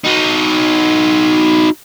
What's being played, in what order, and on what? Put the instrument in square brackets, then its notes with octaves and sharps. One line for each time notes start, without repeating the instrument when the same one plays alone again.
[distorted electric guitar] D#4 F#4